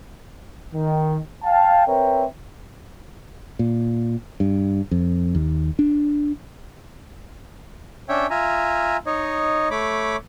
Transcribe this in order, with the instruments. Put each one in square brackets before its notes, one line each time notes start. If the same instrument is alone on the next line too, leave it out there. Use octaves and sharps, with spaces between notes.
[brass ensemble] D#3
F5 G5 A5
C4 A#4 B4 C#5 E5 G5
[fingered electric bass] A#2
G2
F2
D#2
D4
[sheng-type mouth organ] C#4 D4 C#5 E5 G5
F4 E5 G#5 A#5
D#4 C#5 D#5
A3 C#5 B5 D6